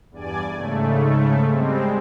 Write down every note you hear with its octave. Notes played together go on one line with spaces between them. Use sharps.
E2 G2 D5 G#5
G#2 C#3 A3
G3 G#3 C4